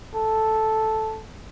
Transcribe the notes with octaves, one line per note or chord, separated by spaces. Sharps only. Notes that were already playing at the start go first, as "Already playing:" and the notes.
A4